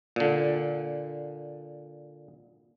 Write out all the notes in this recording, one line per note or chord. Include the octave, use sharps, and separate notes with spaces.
A#2 D3